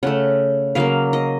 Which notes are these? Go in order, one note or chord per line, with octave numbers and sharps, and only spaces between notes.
C#3 A3 F#5
C#3 F#3 A#3 F5
D#5